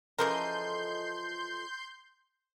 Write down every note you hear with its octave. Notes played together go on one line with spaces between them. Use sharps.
C#3 E3 F3 A4 A#4 D#5 C6 G6